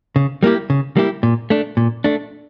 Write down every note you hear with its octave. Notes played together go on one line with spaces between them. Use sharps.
C#3
G3 A#3 E4 G4
C#3
G3 A#3 E4 G4
A#2
A3 D4
A#2
A3 D4